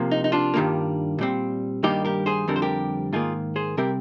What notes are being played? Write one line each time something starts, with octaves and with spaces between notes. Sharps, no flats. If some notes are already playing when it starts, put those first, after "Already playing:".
Already playing: C3 F3 A#3
D#4
D#4
D4 F4
G2 D#3 G3 A#3
A#2 G3 C4
G2 D#3 G3 A#3 D#4 G4
G4 A#4
G#4 C5
F2 D3 G3 C4 A#4
C5
G4 A#4
G#2 D#3 A#3 F4 G#4
G#4 C5
C3 G3 C4 G4 A#4